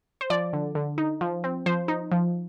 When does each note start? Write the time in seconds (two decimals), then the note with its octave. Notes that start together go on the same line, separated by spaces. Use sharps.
0.21 C5
0.30 F3 D5
0.53 D3
0.75 D3
0.98 D#4
1.21 F3
1.44 C4
1.66 F3 C5
1.88 D#4
2.12 F3